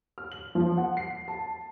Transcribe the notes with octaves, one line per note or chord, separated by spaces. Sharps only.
F6
F#7
F3
F#5
C7
A5